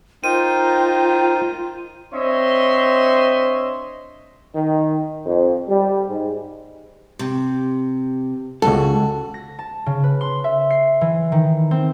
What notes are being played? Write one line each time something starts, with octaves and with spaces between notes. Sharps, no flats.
D#4 F4 A#4 C5 G5 D#7
C4 D4 C#5 D#5 E5 C6
D#3
F2
G3
G#2
C3
C#2 F#2 F#4 A4
A#6
A5
C#3
B4
C6
E5
C7
E3
D#3
C4